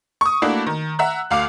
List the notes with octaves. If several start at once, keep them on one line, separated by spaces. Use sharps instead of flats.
C#6 D#6
A3 A#3 D4 E4 F#4
D#3
E5 F#5 A#5 E6 F#6
D2 F5 D6 F7